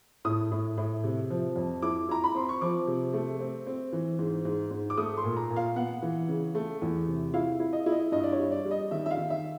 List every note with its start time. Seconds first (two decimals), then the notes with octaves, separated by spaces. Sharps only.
0.25 A2 D#6
0.51 A2
0.77 A2
1.04 C3
1.30 F3
1.56 F2
1.82 E4 D6
2.09 E4 A#5
2.24 B5
2.35 C4 C6
2.49 C#6
2.61 F3 D6
2.87 C3
3.13 A3
3.39 C4
3.66 C4
3.93 E3
4.19 G#2
4.45 G#2
4.71 G#2
4.90 D6
4.97 A3 D#6
5.17 C6
5.24 A#2
5.36 A#5
5.50 A#2
5.56 F5
5.76 B3 F#5
6.02 E3
6.28 C#3
6.55 A3
6.82 E2
7.07 C3
7.34 E4 F5
7.60 E4
7.73 D#5
7.86 E4
7.92 D#5
8.12 G2 D#5
8.23 D5
8.32 C#5
8.39 G3
8.51 D5
8.65 G3
8.71 D#5
8.91 D#3 E5
9.06 E5
9.11 F5
9.17 D#3
9.30 E5